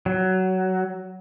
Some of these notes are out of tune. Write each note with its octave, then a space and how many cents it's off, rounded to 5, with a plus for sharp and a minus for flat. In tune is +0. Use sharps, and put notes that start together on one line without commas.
F#3 +15